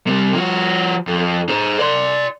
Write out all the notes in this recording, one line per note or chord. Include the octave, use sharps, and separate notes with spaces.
C3 G3
F3 F#4
F2
G#4 C5
D5 C6